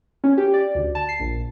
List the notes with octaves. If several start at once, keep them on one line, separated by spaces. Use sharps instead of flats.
C#4
G4
D5
D2
A5
C7
A#1